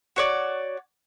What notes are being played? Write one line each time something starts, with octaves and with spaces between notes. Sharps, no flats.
F#4 C#5 D5